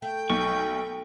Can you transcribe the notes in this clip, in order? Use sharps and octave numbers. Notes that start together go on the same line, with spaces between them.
A3 G5
B1 C#6